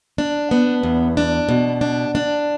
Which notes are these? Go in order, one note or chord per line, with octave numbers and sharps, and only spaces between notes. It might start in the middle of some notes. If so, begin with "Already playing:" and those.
D4
B3
E2
D4
B2
D4
D4